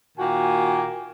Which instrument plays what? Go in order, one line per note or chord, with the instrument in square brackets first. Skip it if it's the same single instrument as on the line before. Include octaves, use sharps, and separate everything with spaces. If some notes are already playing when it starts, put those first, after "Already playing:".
[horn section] A#2 D#3 A#3 F#4 G5 G#5